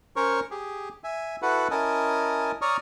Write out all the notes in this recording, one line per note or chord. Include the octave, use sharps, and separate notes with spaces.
C#4 A#4 C5 C#5 C#6
G4 G#4
E5 G#5
E4 F#4 A4 B4 F#5
C#4 E4 A#4 D#5 G#5 A5
C#5 D5 A#5 C#6 D#6 F6